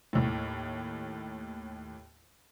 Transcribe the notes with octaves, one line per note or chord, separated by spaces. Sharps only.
D#2 A2